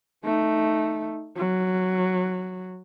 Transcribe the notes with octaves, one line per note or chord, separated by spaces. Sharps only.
A3 D#4
F#3